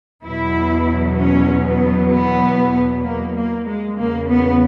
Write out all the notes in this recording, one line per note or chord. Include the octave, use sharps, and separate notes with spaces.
E2 B2 F#3 E4
C#4
B3
B3
A#3
A#3
G#3
E2 C#3 F#3 A#3
B3